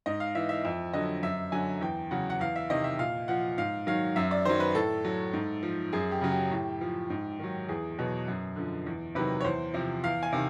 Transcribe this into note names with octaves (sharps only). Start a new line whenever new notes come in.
G#2 D#5
F5
E3 E5
E5
F2 E5
D3 F#3 D#5
F#2 E5
D3 F#3 G#5
E2 G5
C#3 F#3 F#5
F#5
E2 F5
E5
C3 D#3 D#5
E5
A#2 F5
F3 F#5
G#2 F5
D#3 F#3 F5
F#2 E5
D5
D#3 F#3 C5
B4
A2 A4
F#3
G#2
F3
F#2 G#4
G4
C#3 F#3
G4
A2 G4
F3
G#2
D#3 F#3
E2 G#4
B2 F#3
F#2
D3 F3
E2
C3 D#3 F#3 B4
C#5
E2 C5
C3 F3
E2 F5
G#5
C3 D#3